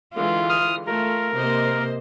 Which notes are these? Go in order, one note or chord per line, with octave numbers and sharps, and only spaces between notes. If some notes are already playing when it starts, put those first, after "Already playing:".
D3 E3 G#3 F4
D#6 F6
A3 F4 A#4
C3 A#3 C5 D#5